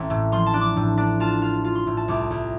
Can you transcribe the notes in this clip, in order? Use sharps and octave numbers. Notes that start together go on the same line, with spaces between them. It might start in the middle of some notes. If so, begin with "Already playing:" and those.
Already playing: A1 C4
A2
F3 C6
A5
D4
D6
A2
D4
F4 A5
F4
F4
C6
A2
A5
C2 D6
C2